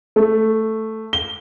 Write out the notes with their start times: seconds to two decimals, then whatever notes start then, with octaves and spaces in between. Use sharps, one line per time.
0.16 A3
1.13 G7